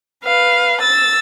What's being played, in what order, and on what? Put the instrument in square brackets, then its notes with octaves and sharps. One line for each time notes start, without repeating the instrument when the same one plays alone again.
[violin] B4 F5
E6 A6